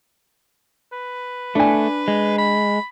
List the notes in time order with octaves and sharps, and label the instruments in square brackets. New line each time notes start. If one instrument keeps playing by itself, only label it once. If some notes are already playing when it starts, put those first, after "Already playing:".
[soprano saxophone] B4
[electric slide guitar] A3 [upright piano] D4 G#5
[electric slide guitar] G#3
[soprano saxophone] B5